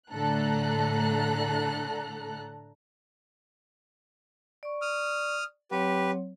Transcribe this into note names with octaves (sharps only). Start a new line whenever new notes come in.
A2 D3 A4 A#5 F#6
D5 C#6
D#6 F6
F#3 C4 G4 B4 C#5